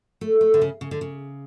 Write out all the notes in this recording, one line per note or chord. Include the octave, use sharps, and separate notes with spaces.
A3
A3
D3
C#3
C#3
D3
C#3